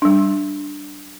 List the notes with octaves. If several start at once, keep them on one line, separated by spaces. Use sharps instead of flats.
G3 D4